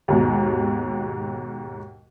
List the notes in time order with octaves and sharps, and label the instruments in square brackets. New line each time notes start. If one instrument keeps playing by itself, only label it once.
[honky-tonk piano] D#2 G#2 B2